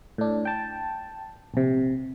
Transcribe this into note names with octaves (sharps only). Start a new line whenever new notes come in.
A2 D4
G5 A5
A#1 C3